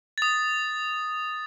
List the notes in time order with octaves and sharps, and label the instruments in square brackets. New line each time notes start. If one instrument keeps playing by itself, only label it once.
[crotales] D#6 A6